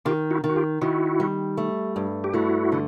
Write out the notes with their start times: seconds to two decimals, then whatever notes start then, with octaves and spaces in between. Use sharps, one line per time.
0.05 D#3 F4 G4
0.31 E4 F#4
0.44 D#3
0.49 F#4
0.56 F4 G4
0.81 D#3 E4 F#4
1.20 G3
1.57 A3
1.96 G2
2.24 G4
2.34 A3 E4 F#4
2.72 D3